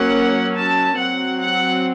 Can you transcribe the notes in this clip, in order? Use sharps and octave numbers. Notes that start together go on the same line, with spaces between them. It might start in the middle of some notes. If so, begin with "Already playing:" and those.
Already playing: F#3 A#3 C#4 F#5
A5
F#3 C4 F#5
F#5